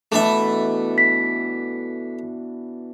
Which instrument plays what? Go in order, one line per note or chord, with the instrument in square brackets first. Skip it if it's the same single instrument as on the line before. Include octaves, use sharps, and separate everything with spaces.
[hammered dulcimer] B2 E3 D4 [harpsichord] A3 A4 E5
[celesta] B6